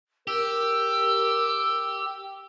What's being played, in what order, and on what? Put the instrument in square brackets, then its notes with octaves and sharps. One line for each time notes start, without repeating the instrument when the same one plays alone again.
[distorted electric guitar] G4 [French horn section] A#4 [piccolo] E6